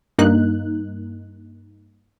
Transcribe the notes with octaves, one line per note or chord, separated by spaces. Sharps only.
G2 A#3 D#4 F#6